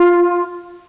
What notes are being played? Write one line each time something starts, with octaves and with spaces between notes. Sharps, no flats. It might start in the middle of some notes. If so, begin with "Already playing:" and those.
Already playing: F4